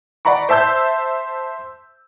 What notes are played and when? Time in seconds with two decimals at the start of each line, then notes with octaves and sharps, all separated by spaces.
0.25 D5 F#5 A#5 B5 C#6
0.49 C5 E5 A5 E6 G6